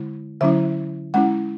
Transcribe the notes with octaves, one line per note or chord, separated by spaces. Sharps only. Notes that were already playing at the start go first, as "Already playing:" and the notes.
Already playing: D3 G#3 E4
D3 F#3 C#4 E4 E5
G#3 C#4 E4 F#5